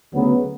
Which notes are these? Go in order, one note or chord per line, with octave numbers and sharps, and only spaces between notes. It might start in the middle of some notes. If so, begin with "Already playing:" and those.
D2 C#3 F#3 B3